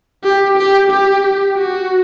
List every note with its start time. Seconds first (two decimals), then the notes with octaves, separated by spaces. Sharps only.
0.24 G4
0.58 G4
0.91 G4
1.57 F#4